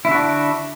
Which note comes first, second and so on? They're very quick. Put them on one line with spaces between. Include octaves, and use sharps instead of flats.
E4 D3 F#4 D4